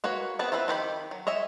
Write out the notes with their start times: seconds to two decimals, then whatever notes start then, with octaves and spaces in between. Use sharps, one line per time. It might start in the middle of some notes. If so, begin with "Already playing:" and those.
0.04 A#3 F#4 B4 C#5
0.39 B3 C4 G#4 B4 A5
0.52 F3 C4 E4 G#4 B4
0.68 D#3 F4 G4 B5
1.11 F#3
1.27 C#5 D#5 E5 G#5